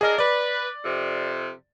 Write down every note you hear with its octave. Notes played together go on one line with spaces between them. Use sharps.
D4 G#4 A#4 D#5
B4 D5
F2 C3